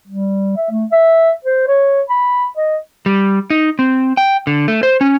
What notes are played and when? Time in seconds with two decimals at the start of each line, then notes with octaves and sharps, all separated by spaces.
0.08 G3
0.57 E5
0.71 A3
0.92 E5
1.45 C5
1.67 C#5
2.09 B5
2.57 D#5
3.06 G3
3.50 D#4
3.79 C4
4.17 G5
4.47 D3
4.68 A3
4.83 C5
5.01 C#4